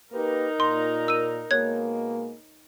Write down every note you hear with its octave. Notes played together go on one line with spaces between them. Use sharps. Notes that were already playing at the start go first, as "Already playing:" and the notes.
A#3 D#4 G4 A#4 B4
A#2 C6
E6 D#7
B2 G#3 A#3 C#5 F#6 G#6